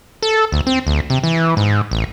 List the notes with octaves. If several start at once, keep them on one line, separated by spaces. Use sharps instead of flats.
A4
D2
C4
D2
C3
E3
G#2
A1